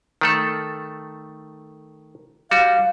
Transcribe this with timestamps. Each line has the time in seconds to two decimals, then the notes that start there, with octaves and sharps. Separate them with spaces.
0.21 D#3 A3 A4
2.51 G3 F#4 F5